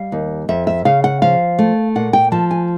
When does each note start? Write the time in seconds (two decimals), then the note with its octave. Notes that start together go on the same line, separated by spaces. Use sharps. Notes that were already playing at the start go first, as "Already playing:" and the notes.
Already playing: G3 F5
0.12 D#2
0.49 F2 E5
0.67 E5
0.85 C#3 F5
1.04 F#5
1.22 F3 F5
1.59 A3
1.95 A#2 F#5
2.13 G5
2.32 F3 A5
2.51 G#5